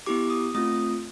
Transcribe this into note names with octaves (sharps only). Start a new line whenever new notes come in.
B3 E4 G4 D6
D#6
A3 C4 F4 D#6